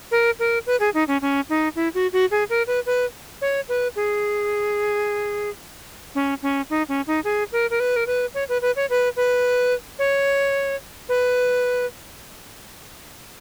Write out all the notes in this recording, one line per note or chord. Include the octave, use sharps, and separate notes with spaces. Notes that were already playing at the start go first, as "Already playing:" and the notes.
A#4
A#4
B4
G#4
D#4
C#4
C#4
D#4
E4
F#4
F#4
G#4
A#4
B4
B4
C#5
B4
G#4
C#4
C#4
D#4
C#4
D#4
G#4
A#4
A#4
B4
A#4
B4
C#5
B4
B4
C#5
B4
B4
C#5
B4